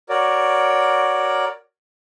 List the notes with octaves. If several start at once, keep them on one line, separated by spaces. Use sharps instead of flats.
F#4 A#4 C#5 D5